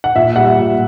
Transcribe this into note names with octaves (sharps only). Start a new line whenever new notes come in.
F#5
A#2 E5
G3 F#5
E5
A#2